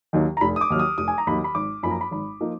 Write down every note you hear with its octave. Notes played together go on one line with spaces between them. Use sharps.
D#2 D#3 F#3
A#5
F1 B5
D#6
D6
D#2 D#3 F#3 F6
D#6
F1 D#6
G#5
A#5
D#2 D#3 F#3 B5
B5
G#1 D6
F#2 F3 A#3 D#4 B5
A#5
B5
G#1 B5
F3 A#3 D#4